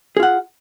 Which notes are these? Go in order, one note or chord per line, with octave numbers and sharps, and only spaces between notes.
F4 G#4 F#5